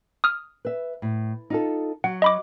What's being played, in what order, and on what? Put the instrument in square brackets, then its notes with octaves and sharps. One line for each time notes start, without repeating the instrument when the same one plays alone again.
[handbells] D#6 F6
[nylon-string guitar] B4 E5
A2
D#4 F4 A4
[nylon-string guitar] F#3 [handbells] F#5
[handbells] D#5 B5 D6